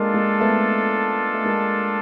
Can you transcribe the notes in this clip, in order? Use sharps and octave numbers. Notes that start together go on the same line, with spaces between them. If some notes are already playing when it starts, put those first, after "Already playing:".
Already playing: G#3 A#3 D4 F4 A4
G#3 A#3
A3 B3
A3
G#3 A#3